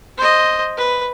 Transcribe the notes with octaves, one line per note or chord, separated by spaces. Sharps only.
C5 D#5
B4